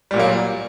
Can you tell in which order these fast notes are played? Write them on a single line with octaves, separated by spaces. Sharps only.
G3 A#2 F#3 A#3